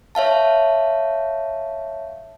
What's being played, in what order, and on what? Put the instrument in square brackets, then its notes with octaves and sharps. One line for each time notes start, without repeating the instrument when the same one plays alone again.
[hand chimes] C#5 E5 F5 A5